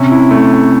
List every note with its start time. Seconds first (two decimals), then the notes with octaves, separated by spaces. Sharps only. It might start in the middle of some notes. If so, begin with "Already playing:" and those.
Already playing: C3 C#4
0.11 E4
0.31 A3